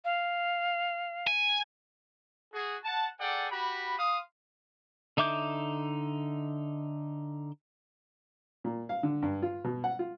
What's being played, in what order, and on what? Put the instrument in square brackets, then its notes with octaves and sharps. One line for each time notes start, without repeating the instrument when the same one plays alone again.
[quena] F5
[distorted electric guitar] G#5
[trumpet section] F#4 G#4
F#5 A5
G#4 A4 D5 F#5 G5
F#4 G4 B5
F5 C6 D#6
[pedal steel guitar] D3 D#4 E5 D6 G6
[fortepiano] A#2
F5
D3
G2
F4
B2
F#5
F4